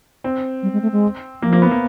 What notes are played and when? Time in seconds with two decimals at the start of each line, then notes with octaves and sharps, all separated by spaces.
0.24 C4
0.63 G3
0.73 G#3
0.82 A3
0.92 G#3
1.42 F3 A#3
1.53 A#3
1.62 B3
1.71 A#3